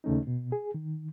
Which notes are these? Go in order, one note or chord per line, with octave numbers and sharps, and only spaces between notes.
D#2 C#3 A3 C#4 D#4
B2
G#4
D#3